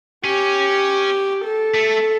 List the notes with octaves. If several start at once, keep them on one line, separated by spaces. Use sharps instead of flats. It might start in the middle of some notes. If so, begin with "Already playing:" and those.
C#4 G4
A4
A3